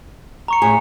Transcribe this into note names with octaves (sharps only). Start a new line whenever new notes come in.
A#5 C#6 C#7
A2 G#4